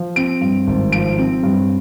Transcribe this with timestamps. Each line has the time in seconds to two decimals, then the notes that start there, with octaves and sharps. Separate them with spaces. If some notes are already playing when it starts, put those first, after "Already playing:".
Already playing: F3
0.16 C4 D7
0.41 G2
0.67 G#1
0.92 F3 D7
1.18 C4
1.43 G2